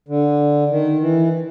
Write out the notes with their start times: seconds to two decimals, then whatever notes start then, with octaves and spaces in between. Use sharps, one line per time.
0.08 D3
0.70 D#3
1.01 E3